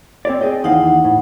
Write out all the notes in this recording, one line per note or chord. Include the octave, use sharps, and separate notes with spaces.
C4 C#5 D5
G#4 D#5 G5
D#2 E3 D#4 F5 F#5
A2